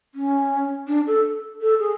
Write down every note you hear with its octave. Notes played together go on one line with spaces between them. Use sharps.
C#4
D4
A4
A4
G#4